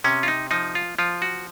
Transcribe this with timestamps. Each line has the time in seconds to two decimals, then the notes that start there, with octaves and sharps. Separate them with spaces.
0.04 C3 C#4
0.23 F4
0.28 D#4
0.51 F3 D#4
0.75 F4
0.99 F3 F4
1.22 F#4